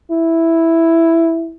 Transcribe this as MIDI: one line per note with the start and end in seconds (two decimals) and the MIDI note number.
0.11 1.56 64